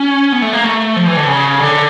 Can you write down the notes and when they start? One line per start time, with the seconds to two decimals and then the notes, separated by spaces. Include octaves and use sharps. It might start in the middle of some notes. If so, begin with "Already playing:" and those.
Already playing: C#4
0.32 B3
0.42 A3
0.53 A#3
0.64 A3
0.96 F3
1.07 E3
1.17 D3
1.27 C#3
1.60 D3